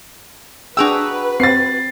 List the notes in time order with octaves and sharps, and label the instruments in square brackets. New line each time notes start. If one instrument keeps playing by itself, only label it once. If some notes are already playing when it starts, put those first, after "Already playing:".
[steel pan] D4 G#4 G5 [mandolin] F#4 A#5 E6 [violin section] B4
[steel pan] C4 [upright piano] A6 C7